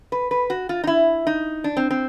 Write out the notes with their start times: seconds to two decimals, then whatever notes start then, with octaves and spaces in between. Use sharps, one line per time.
0.12 B4
0.31 B4
0.50 F#4
0.69 F4
0.84 D#4
0.87 E4
1.27 D#4
1.64 D4
1.77 C4
1.91 C4